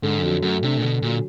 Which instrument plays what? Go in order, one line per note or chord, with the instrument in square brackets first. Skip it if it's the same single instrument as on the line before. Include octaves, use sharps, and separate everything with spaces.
[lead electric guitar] G#2 [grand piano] D3
[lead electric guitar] F#2
[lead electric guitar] F2 [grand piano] F#3
[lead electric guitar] F#2 [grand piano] A3
[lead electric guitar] C3 [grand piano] D4
[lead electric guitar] A#2
[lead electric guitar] B2 [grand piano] D3
[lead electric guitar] A#2 [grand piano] F#3